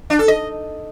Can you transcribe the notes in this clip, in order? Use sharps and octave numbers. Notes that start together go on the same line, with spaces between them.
D4
A4
D#5